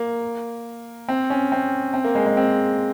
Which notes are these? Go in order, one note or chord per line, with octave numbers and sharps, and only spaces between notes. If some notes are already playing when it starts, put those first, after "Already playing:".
Already playing: A#3
C4
C#4
C4
C4
A#3
G#3
G#3
C4